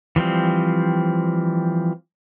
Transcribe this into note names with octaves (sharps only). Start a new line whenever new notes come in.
E3 F3 G3 C4